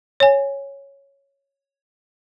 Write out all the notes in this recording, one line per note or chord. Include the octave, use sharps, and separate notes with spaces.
C#5 G#5